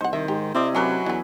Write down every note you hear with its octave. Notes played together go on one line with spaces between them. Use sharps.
C2 D#4 C5 F#5
D#3 E5
G#2 G4
C3 C4 E4 D5 D#5
F#3 A3 C#4 A#4 B4
E2 D3 G#4